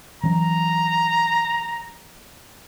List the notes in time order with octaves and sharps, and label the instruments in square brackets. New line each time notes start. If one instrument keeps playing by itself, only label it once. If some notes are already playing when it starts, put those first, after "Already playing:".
[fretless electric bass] E3 F#3 C#4 [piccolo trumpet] A#5